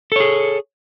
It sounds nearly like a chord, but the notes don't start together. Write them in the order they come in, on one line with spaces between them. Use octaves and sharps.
A4 C#5 G#4